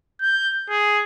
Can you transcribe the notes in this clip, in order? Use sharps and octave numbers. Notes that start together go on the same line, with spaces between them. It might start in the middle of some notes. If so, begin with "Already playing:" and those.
G6
G#4